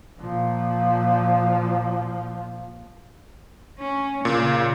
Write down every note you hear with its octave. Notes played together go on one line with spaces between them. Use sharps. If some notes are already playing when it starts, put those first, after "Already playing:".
A#2 F3
C#4
A#2 C#3